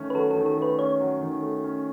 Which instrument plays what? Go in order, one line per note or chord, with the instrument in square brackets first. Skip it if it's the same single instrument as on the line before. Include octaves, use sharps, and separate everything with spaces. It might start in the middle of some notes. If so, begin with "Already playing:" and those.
Already playing: [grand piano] D#3 A3 C#4
[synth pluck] B4
[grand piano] F#3 [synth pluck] A4
[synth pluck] A4
[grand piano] D#3
[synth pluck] A4
[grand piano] A3 [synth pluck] B4
[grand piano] C#4 [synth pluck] C#5
[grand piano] F#3
D#3
A3
C#4